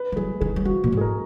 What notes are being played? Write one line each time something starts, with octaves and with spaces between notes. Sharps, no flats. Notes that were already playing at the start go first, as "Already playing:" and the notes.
Already playing: B4
F3
F#3 G#4
D#3 G#4
F#3
F3 F#4
A#2
G#2
G#4
A#4